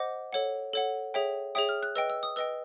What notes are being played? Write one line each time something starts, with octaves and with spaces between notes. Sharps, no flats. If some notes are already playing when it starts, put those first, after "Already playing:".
Already playing: C5 D#5 F#5 D6
A4 C#5 F#5
A4 C#5 F#5
G#4 C#5 E5 G5
G#4 C#5 E5 G5 D#6
F6
F#6
B4 D#5 G5 E6
E6
D#6
B4 D#5 G5 E6